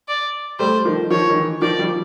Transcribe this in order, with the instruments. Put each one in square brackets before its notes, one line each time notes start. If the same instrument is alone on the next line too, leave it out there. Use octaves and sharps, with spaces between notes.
[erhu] D5
[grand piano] G3 A3 [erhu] C5
[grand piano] D#3 F3
[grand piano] D#3 F3 [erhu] C#5
[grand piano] D#3
E3
[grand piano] D#3 F3 [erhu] D5
[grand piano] F3 G3